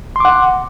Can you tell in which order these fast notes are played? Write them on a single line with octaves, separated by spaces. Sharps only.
C6 D6 F#5